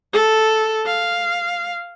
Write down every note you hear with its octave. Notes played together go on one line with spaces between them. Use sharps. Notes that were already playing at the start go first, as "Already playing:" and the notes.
A4
F5